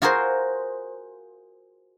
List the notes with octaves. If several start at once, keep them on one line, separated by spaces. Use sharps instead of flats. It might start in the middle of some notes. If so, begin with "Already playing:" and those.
F4 F#4 G#4 A#4 C5